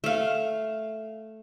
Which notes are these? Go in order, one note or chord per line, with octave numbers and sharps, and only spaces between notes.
A3 F5